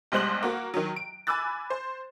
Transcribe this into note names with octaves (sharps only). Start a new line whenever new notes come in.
B1 G3 G#3 C5 F#6 F#7
A#3 F#4
D#3 F#3
D7
G#5 B5 D6 E6 F#6 A6
C5